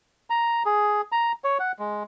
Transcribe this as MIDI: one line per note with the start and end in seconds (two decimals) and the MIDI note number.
0.30 0.63 82
0.66 1.01 68
1.12 1.32 82
1.44 1.58 73
1.59 1.72 78
1.79 2.03 56